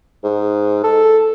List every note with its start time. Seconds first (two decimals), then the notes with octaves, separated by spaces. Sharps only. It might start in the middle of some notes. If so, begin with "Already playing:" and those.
0.23 G#2
0.83 A4